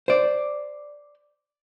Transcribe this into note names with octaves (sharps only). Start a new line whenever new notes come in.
C5 D5